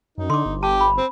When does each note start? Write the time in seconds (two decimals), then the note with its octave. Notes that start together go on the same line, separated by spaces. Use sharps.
0.18 F#2 D#4
0.30 D3 C6 D6
0.46 G1
0.63 G4 A5
0.81 B5
0.98 C4